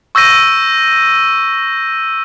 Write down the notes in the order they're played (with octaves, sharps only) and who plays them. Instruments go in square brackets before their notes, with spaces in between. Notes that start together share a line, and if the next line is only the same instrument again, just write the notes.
[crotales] C#6 E6 G6 A#6 D#7